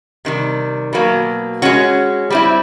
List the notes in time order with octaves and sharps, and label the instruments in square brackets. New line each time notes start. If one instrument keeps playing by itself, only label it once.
[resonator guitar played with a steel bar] C3 D#3 G3
B2 F#3 A#3
G#3 C#4 F#4
G3 C4 E4